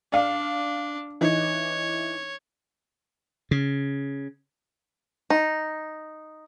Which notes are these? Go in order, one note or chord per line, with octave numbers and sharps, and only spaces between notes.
D4 D5 F5
E3 D#4 C#5
C#3
D#4